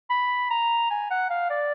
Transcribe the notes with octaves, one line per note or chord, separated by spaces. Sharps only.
B5
A#5
G#5
F#5
F5
D5